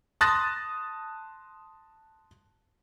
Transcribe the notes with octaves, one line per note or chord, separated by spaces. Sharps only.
A5 C6 D#6 F#6 A6 A#6